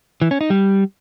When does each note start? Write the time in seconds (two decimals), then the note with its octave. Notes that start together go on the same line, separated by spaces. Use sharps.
0.22 E3
0.31 C#4
0.41 D#4
0.50 G3